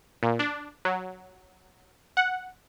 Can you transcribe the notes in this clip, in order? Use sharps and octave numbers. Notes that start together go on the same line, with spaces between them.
A#2
D4
F#3
F#5